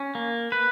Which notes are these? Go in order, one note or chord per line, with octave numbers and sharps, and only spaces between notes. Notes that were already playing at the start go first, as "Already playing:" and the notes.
Already playing: C#4
A#3
B4